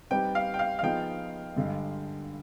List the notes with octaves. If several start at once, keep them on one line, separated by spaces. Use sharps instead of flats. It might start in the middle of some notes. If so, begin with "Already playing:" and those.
G3 C4 D#4 G4 B4 G5
F5
G5
F5
F5
F3 B3 D#4 G#4 G5
G2 D3 G#3